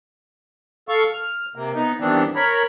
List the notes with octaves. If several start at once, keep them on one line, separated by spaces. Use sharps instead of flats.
A4 F5 C#6
F6
C3 A#3
B3 D#4
G2 D#3 E3 B3 C4 D4
A#4 C#5 B5